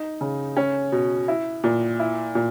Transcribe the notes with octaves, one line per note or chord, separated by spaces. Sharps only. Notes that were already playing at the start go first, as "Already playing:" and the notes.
Already playing: D#4
C#3
C#4
B2
E4
A#2
E4
A#2